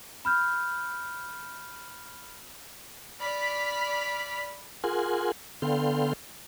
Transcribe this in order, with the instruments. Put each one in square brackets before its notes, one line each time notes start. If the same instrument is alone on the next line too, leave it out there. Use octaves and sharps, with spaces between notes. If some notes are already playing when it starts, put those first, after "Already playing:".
[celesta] B5 F6 G6
[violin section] D5 B5 F6 B6
[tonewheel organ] F4 G#4 A#4 F#5 G#5 C6
D3 B3 A4 F5 G5 C6